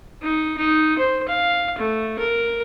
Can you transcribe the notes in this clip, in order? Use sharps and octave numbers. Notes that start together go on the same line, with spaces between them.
D#4
D#4
C5
F5
A3
A#4